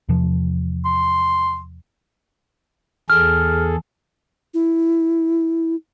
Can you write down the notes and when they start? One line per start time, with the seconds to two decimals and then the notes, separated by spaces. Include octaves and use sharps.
0.09 E2 C3 F3
0.85 C6
3.10 E2 G#4 A4 F6
4.54 E4